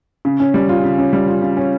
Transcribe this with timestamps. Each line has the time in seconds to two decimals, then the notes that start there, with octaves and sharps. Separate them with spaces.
0.25 C#3
0.40 C#4
0.54 G3
0.69 F4
0.84 C#3
0.98 C#4
1.13 G3
1.28 F4
1.42 C#3
1.57 C#4